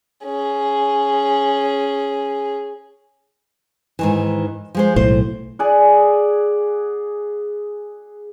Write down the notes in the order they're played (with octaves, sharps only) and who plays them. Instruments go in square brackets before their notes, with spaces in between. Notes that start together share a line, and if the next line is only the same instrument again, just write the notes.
[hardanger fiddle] C#4 G#4
[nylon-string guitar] G#2 D#3 E3
F3 G#3 C5
[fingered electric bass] B1 A2 [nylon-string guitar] C5
[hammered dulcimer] G#4 D5 F#5